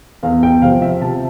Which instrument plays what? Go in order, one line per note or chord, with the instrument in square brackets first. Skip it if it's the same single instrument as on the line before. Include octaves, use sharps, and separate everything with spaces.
[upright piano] E2 F5
G5
C3 F5
F3
E5
C3 A5